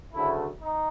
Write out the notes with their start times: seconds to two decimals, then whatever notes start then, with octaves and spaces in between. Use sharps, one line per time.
0.14 D2 C#3 F#3 A3 E4
0.60 D#4